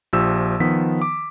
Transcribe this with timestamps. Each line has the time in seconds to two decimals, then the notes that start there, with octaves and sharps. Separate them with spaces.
0.13 A#1 F3 G4 E6
0.60 D#3 F3 B3 B6
1.02 D6